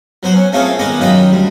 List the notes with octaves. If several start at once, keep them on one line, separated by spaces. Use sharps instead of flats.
F#3 B3 C5
C#4
A3 A#3 C4 C#4 F4 G#4
D#3 G#3 B3 D#5 D6
F#2 D#3 F4 D#5 G5 B5
D2 G3